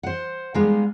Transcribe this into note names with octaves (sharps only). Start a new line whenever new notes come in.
C5 F#5
G3 G#3 B3 D#4 A#4 F5